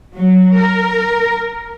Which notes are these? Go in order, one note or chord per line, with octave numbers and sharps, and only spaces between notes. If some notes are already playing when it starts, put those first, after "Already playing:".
F#3
A#4